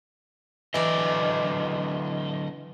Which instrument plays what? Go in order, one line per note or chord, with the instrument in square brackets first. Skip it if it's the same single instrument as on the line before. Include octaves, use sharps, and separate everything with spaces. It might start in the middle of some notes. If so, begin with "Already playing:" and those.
[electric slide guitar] D3 F#3 D#5 [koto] E3 D5